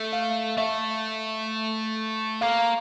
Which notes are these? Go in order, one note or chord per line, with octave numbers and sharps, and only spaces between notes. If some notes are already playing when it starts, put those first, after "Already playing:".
Already playing: A3 E5
F5
A3 E5
A#3 F5